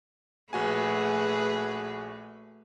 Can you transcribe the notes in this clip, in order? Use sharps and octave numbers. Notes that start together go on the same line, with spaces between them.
A#1 A3 F#4 G#4 B4 G#5